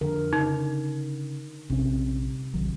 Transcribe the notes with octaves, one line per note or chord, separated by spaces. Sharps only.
F2 D3 A#4
C#3 D#4
A#1 C3 C#4
A#1 D#3 F#3